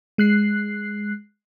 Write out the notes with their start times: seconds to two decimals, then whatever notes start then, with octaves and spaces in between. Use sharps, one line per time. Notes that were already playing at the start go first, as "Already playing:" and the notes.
0.18 G#3 F#6 C7